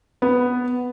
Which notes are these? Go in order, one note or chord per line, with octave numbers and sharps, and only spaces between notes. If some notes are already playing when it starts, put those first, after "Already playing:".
B3